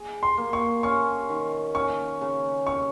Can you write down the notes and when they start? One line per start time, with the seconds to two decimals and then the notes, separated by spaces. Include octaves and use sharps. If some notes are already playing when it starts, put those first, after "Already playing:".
Already playing: G#4
0.23 C6
0.37 A#3
0.53 C#6
0.83 C#4 C#6
1.29 D#3
1.75 C#4 C#6
2.21 C#3
2.67 C#4 C#6